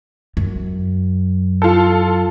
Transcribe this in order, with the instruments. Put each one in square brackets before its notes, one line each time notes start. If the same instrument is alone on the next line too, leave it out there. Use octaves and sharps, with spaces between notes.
[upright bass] F#2
[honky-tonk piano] F4 A4